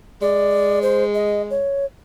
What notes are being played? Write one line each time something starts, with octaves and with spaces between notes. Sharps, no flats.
G#3 D5
C5
D#5
C#5